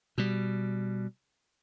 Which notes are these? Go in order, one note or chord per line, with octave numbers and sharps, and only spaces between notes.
B2 G3